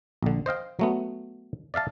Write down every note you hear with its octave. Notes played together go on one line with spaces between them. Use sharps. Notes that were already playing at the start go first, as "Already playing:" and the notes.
A#1 D3
C5 D#5 F5 G5
F#3 A3 B3
D5 E5 F5 A5